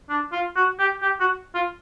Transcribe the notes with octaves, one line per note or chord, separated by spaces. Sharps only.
D4
F4
F#4
G4
G4
F#4
F4